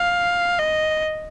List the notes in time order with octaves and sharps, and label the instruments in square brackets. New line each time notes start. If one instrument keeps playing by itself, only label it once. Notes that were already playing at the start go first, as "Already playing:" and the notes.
Already playing: [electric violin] F5
D#5